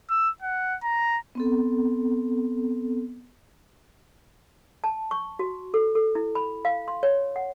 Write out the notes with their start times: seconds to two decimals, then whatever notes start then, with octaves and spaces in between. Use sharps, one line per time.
0.10 E6
0.42 F#5
0.83 A#5
1.35 B3 C4 A4
4.84 A5
5.11 C#6
5.39 F#4
5.74 A4
5.95 A4
6.15 E4
6.35 B5
6.65 F5
6.88 C6
7.03 C#5
7.36 F#5